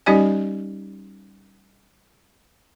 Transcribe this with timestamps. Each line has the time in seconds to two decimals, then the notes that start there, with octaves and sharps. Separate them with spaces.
0.06 G3 C#4 D#4 G4 D5 G#5